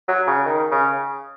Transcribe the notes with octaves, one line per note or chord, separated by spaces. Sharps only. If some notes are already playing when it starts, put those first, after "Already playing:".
F#3
C#3
D#3
C#3